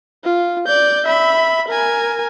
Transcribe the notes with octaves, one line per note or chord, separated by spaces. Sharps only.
F4
D5 G6
E5 B5
A#4 G#5